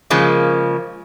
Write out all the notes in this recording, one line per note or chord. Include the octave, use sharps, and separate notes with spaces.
C#3 F3 G#3 A#3